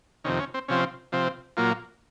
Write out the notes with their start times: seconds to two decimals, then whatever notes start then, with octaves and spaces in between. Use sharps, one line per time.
0.24 F2 C3 D#3 C#4
0.40 C#4
0.54 C4
0.68 C3 F3 C4 C#4
1.12 C3 F3 C4
1.57 A#2 F#3 A#3 F4